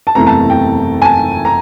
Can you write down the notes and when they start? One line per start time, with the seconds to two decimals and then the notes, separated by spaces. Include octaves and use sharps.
0.07 A5
0.15 F#1 E2 C3 E3 A3 A#5
0.26 A5
0.50 G5
1.02 G#5
1.05 A5
1.45 A#5